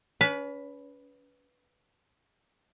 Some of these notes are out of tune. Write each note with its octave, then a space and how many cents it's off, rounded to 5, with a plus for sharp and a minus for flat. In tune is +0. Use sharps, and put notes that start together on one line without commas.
C#4 +35 B4 +0